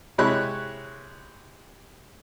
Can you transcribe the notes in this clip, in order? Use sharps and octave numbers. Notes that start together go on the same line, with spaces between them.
C3 G#3 E4 C#5 B5 F#6